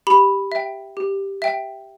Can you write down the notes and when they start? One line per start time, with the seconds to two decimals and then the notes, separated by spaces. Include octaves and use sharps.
0.07 G4 B5
0.52 E5 G5
0.97 G4
1.42 E5 G5